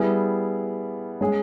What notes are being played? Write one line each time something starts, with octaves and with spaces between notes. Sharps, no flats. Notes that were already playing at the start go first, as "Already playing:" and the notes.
Already playing: G3 B3 E4 G#4
G#3 C#4 G#4